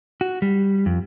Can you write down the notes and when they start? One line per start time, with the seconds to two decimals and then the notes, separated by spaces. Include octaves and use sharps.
0.21 F#4
0.42 G3
0.86 F2